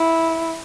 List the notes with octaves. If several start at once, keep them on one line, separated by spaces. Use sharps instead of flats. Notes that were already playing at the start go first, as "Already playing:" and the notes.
Already playing: E4